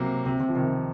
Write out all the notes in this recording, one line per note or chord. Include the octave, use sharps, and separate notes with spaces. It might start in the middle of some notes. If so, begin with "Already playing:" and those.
Already playing: C3 F#3 A#3
C3
C3
F3
C3 D#3